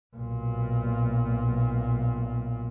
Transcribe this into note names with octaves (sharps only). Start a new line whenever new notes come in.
B1 A#2